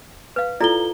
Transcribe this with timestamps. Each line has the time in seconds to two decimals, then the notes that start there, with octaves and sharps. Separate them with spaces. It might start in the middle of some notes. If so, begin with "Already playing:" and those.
0.36 B4 F5
0.60 E4 F4 A4 D5 A#5 G7